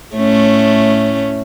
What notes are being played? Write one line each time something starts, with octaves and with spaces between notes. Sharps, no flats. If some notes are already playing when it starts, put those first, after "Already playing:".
A2 A3 C#4